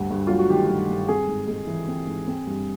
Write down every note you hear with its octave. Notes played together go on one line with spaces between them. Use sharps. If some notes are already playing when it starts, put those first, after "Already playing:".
Already playing: D2 G2
G2
F#3 F4
F#4
D#3 G4
G2
G2
C4 G#4
G#2
G#3
E3
C4
G#2
C4
G2